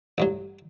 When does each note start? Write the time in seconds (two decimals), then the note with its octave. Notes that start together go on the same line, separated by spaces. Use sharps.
0.18 A1 G2 F#3